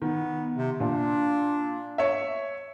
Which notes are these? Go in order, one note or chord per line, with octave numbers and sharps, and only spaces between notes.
D#3 B3
C3
A#2 D4
C#5 E5